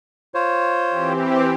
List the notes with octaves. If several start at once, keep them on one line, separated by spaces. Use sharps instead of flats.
F4 C5 C#5
E3 C4 G4